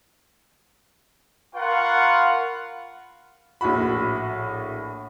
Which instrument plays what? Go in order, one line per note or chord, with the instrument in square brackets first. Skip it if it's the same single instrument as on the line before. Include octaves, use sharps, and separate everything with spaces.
[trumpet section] F4 A#4 F5 F#5 B5 C#6
[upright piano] A#1 A2 F#4 B5